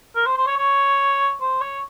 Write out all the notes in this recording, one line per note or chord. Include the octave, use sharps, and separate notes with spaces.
A#4
C5
C5
C#5
C#5
C5
C#5